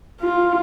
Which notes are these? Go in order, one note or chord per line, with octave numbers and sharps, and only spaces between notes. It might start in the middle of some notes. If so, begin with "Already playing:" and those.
F4